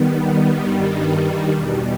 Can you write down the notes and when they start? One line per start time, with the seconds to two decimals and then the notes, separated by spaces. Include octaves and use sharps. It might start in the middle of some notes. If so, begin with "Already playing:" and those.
Already playing: D#3 G3 B3
0.60 G2 D#3 G3
1.50 E2 B2 G3